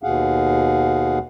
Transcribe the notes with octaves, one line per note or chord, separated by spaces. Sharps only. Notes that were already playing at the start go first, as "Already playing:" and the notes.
D#2 B2 G#4 F5 F#5